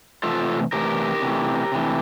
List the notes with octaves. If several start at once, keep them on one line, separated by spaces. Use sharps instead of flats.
C3 E3 A3 F4 A4
C3 E3 A3 G4 A#4
C3 E3 A3
C3 E3 A3